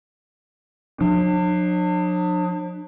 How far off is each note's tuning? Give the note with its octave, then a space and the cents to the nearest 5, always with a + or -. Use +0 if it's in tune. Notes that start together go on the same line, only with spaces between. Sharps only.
F#3 -45 D4 +35